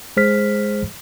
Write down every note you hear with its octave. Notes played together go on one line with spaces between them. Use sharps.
G#3 G#4 C5 F6 B6